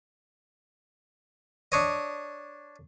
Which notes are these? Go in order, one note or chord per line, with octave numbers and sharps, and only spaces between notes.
D4 C#5 D#5